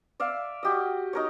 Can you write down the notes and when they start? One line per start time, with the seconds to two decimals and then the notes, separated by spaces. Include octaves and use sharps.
0.20 D5 E5 F5
0.63 F#4 G4 D#5
1.13 D#4 A#4 C#5